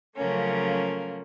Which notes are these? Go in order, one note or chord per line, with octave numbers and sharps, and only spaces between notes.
C#3 F3 F#3 A3 A#3 C#4